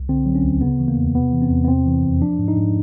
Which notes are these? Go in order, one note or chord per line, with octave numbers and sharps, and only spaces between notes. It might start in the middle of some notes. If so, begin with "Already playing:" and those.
Already playing: C2
D3 C4
F#3
C#4
D2
C#3 B3
E3
A#3
E2
C3 B3
E3
C4
E2
B3
C3 C4
E3
F2
F3 D4
G#2
D#4
G#2